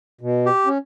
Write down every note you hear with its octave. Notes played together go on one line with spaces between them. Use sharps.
B2
G4
C#4